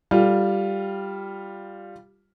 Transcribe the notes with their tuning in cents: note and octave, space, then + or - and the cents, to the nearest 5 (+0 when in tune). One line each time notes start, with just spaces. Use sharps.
G3 +0 F4 +0 A4 +0